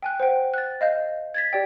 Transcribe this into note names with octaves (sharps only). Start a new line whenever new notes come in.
G5 G#5 F#6
C5 F#5 G5
F#6 A6
D#5 F5 G6
G#6 A6 B6
G4 D5 G5